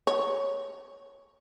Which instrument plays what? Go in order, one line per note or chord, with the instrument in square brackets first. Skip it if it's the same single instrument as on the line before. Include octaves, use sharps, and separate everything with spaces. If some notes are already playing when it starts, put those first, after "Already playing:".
[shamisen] C#5